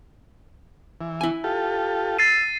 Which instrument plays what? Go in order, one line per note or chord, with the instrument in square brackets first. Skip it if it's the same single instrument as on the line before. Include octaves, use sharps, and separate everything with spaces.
[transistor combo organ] E3
[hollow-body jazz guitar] E4 G#5
[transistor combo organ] F4 G4 A4
[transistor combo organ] E6 [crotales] A6 C7 D#7